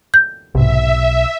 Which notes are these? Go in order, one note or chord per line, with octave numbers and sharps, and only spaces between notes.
G6
B1 G#2 C3 E5